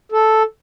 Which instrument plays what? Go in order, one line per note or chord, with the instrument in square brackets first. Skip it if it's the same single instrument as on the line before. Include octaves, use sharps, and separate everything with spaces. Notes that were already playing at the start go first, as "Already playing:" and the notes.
[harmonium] A4